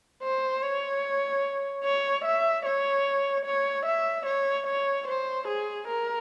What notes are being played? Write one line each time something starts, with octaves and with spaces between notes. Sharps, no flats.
C5
C#5
C#5
E5
C#5
C#5
E5
C#5
C#5
C5
G#4
A#4